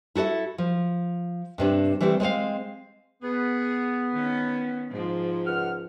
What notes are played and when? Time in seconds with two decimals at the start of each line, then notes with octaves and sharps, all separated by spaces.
0.15 E4 F#4 A4 D5 E5
0.58 F3
1.58 G2 C3 D4
2.01 E3 G3 A3 C4 E4
2.20 G#3 C4 C#5 F5
3.23 B3 G#4
4.12 D#3 C#4
4.91 G#2 F3
5.46 C#2 F#5 F6